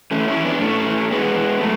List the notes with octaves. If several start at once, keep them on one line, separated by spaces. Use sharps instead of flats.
E3 A3 C#4
C#4 E4
E3
B3 D4
A2 A3 C#4
E3
E3 G#3 B3
E3
F#3 A3